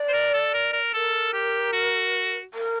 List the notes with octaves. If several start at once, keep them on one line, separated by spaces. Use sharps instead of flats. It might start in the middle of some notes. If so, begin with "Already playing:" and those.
Already playing: D5
C5
A#4
A4
A#4
A#4
A4 A#4
G4
F#4
A#4